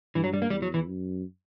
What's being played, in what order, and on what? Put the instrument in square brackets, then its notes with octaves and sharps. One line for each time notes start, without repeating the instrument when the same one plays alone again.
[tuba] G2 [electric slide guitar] E3
[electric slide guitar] F#3
G3
A#3
[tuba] E2 [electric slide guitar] G3
[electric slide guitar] F#3
E3
[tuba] F#2